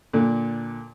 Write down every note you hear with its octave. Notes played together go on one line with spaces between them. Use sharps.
A#2 D3